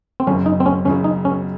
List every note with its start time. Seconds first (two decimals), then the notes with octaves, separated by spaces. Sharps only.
0.20 C4
0.27 F#1 F#2 C#3 C#4
0.46 D#4
0.60 C4
0.66 C#4
0.85 F#1 F#2 C#3 C#4
1.04 D#4
1.25 C#4